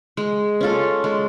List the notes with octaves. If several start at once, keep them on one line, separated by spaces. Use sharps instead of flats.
G#3
C#4 F4 A4
G#3